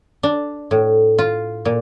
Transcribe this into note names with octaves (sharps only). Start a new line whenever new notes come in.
D4
A2
F4
A#2